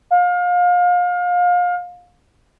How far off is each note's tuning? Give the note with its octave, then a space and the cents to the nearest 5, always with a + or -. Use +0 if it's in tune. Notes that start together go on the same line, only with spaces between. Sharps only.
F5 +30